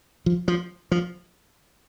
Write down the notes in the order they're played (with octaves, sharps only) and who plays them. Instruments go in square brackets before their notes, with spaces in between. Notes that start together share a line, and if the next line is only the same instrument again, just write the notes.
[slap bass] F3
F3
F3